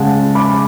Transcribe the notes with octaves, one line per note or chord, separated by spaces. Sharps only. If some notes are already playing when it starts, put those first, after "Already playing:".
Already playing: C#3 G#3 F#5 A5
B5 D6